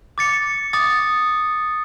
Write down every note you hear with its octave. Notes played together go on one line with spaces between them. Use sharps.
D6 A6 C#7
D6 D#6 A6